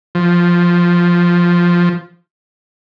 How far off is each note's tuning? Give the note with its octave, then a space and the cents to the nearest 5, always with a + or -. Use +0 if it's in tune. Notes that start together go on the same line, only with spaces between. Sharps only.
F3 +0